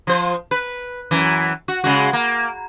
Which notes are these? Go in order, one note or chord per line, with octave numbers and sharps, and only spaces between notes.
F3 C5
B4
F#2 E3
F#4
C#3 G#3 F#4
A#3